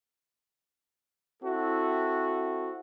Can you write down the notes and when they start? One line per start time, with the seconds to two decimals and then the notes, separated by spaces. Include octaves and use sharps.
1.43 C4 E4 F#4 A4